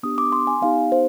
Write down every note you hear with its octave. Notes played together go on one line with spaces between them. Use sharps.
B3 D4 G4 D#6
D6
C6
G#5
B3 D#4 G4 F5
C5